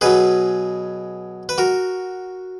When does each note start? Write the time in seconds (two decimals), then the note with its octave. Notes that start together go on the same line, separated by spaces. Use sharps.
0.01 B2 F#3 G#4 B4
1.49 B4
1.58 F#4 A#4